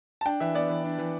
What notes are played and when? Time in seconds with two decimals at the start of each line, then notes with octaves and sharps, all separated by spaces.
0.21 A5
0.26 D4 G5
0.40 E3 E5
0.55 B3 D5
0.70 E3
0.84 D4
0.98 E3